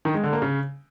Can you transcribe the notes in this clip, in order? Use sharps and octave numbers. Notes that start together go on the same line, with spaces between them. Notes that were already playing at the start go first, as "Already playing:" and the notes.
D#3
G#3
D3
A#3
C#3